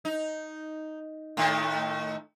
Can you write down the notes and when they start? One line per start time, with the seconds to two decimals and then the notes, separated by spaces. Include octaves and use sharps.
0.05 D#4
1.37 A2 D#3 A3